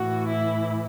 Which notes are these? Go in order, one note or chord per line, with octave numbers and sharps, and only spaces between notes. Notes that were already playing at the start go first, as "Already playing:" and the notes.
Already playing: A2 E3 F#4
E4